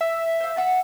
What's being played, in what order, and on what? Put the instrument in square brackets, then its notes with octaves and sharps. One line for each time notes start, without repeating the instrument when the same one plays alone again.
[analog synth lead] E5
[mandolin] C5 F5
E5 F#5 A5